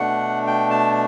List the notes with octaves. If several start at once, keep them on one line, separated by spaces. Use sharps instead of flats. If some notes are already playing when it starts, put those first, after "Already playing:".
Already playing: B2 A3 D4 F#5
G5
A5